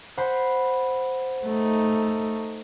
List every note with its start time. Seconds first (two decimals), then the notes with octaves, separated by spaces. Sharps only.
0.18 C5 F#5 B5
1.45 A3 D#4